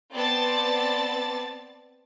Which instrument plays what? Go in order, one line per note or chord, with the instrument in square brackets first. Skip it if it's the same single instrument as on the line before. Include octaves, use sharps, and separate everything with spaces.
[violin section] B3 C4 D5 A5 A6